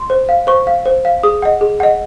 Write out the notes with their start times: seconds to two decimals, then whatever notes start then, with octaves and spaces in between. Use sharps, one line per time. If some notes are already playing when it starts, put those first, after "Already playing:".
Already playing: C6
0.10 C5
0.29 F5
0.47 C5 C#6
0.67 F5
0.86 C5
1.05 F5
1.23 G#4 D#6
1.42 D#5 F#5
1.61 G#4
1.80 D#5 F#5